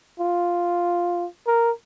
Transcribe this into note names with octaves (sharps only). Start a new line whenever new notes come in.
F4
A#4